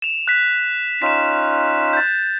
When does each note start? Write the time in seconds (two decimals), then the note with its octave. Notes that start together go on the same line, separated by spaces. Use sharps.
0.02 E7 F7
0.28 F#6 B6
1.02 C#4 D#4 F4 B6 E7
1.93 G6 A6